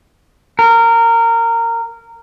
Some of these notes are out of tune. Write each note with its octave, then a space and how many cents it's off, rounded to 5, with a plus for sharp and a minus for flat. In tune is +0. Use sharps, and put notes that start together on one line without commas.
A#4 -20